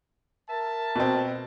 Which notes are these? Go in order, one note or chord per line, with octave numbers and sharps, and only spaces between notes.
A#4 E5 A5
B2 C4